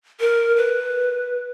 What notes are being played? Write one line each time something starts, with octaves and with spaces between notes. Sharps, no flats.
A#4
B4